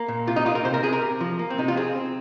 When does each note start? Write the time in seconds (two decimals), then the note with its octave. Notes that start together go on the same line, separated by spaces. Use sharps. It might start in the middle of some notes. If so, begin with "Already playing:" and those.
Already playing: A#3
0.08 A#2
0.27 C3 F4
0.36 D#4
0.45 A#3 F4
0.55 A#4
0.65 C3 C5
0.74 A#4
0.83 C3 G#4
0.93 A#4
1.02 C3
1.21 F3
1.39 A#3
1.50 C4
1.58 C3 D#4
1.68 F4
1.76 C4 G#4
1.96 C4